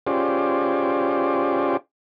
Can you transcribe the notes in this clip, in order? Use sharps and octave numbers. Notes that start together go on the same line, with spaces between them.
C#4 F4 G4 G#4 C5 D5